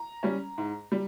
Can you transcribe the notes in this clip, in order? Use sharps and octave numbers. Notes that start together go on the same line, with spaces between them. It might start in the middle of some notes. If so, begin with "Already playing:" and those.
Already playing: A#5
G3 C#4
G#2
G3